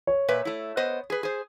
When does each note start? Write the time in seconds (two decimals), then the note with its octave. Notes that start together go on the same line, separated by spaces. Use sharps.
0.07 C#5
0.28 A#2 B4 E5
0.45 A3 E4
0.77 B3 C5 D#5
1.10 G#4 B4
1.23 G#4 C5